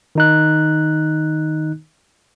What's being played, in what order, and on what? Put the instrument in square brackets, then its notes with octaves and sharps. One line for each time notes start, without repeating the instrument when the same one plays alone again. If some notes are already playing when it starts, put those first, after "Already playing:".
[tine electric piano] D#3 D#4 F#6